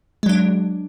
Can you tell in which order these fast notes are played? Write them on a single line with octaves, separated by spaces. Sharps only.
G#3 F#3 D4